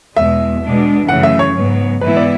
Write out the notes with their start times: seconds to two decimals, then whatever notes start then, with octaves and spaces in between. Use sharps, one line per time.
0.16 E2 B2 G#3 E5
0.63 B2 G#3 D4
1.08 F#2 C#3 E3 A3 F#5
1.23 E5
1.39 C#5
1.55 G#2 F#3 B3
2.00 G#2 E3 B3 E4 B4
2.16 D5